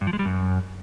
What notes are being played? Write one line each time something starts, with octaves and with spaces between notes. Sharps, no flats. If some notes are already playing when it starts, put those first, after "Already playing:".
G2
F3
G#3
G3
F#2